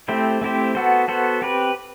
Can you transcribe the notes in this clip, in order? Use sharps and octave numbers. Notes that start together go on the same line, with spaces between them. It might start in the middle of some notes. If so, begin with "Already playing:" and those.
A3 C4 E4 G4 C5
A3 C4 E4 G4 C5
B3 F#4 A4 C5
B3 F#4 A4 C5
C4 G4 B4